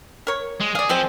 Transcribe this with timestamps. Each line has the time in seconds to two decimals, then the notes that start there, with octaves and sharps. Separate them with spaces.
0.27 A#4 C#5
0.61 G#3
0.75 G#4 D5 F5
0.89 F3 G#3 C4 C5